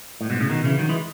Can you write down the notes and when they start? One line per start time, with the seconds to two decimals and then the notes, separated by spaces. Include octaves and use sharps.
0.21 A2
0.30 G#2 B2
0.40 A2 C#3
0.50 B2 D#3
0.64 C#3 E3
0.79 D#3 F#3
0.89 E3 G#3